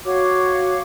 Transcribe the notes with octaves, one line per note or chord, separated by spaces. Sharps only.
F#4 C#5 F5 D6